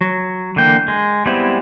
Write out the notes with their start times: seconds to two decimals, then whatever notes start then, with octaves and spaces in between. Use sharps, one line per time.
0.01 F#3
0.56 D3 E3 A#3 G5
0.88 G#3
1.26 G3 G#3 B3 C4 E4